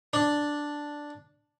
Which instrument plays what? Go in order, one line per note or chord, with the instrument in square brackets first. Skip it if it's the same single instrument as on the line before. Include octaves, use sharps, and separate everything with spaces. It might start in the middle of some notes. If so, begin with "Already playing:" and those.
[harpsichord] D4